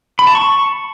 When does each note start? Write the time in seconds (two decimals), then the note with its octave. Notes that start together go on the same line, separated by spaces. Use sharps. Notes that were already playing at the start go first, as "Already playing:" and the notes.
0.19 B5
0.27 A5
0.35 C#6